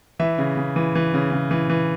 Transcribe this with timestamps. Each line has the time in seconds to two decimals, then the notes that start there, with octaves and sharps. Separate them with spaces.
0.19 E3 E5
0.38 C#3
0.57 C#3
0.76 E3
0.95 E3
1.14 C#3
1.32 C#3
1.51 E3
1.70 E3